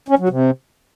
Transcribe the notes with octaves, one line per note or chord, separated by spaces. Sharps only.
C#4
F#3
C3